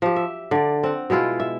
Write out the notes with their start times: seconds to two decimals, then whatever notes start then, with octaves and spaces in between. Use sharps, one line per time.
0.02 F3 G4
0.16 E5
0.51 D3 D5
0.83 C4 F#5
1.10 B2 G#3 E4 F4
1.40 E5